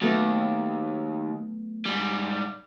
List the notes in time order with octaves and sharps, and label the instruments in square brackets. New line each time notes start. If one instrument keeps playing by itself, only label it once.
[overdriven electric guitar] D#2 [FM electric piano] F#3 A3 B3
[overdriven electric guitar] G#2 G3